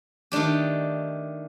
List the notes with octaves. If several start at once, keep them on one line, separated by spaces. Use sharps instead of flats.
D#3 A3 D4 G4